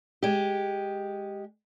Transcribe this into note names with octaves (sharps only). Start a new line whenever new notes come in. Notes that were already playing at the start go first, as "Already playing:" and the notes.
G#3 G4